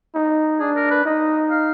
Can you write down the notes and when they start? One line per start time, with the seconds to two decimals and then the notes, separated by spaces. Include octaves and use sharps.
0.15 D#4
0.59 D4 G#4
0.76 A#4
0.90 B4
1.05 D#4 D#5
1.51 F5